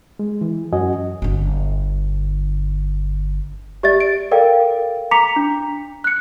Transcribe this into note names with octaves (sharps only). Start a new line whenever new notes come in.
G#3
E3
F#2 C#4 F#4 D#5 G#5
G1 D3
G4 D5 E5 A6
D7
A4 A#4 D5 F5 G5
A#5 D6 B6 C#7 F7
D4
F#6 C#7